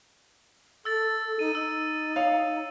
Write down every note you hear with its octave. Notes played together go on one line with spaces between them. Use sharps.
A4 E6 A6
D#4 D#7
D#4 E6
C#5 F5